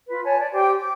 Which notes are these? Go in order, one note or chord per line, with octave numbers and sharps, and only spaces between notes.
F4 B4
C#5 G#5 A5
D5
G4 C5 G5 D6
D6